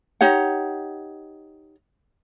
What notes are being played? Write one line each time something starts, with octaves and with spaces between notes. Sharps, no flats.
D#4 G4 C#5 F#5